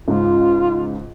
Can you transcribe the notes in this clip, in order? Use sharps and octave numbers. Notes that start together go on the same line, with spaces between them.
C#2 G#2 F4